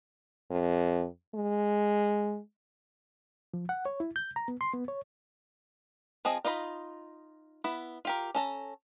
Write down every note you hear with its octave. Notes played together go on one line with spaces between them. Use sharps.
F2
G#3
F3
F#5
C#5
E4
G6
A#5
B3
C6
B3
C#5
F3 C4 G#4 D#5
D#4 F4 D#5 B5
B3 E4
F4 G4 A#4
C#4 A4 A#5